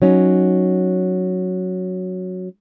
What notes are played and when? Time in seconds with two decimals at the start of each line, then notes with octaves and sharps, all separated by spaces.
0.02 F#3 C#4 D#4